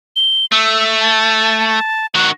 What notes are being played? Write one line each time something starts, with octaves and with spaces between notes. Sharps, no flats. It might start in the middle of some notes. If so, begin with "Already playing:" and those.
G7
A3 E6
A5
D#3 F#4 F#6